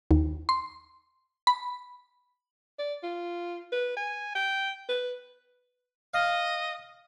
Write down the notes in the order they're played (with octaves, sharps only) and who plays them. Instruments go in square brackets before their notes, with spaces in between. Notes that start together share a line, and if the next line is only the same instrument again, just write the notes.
[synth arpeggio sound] D#2
C6
B5
[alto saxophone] D5
F4
B4
G#5
G5
B4
[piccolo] D#5 [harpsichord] F5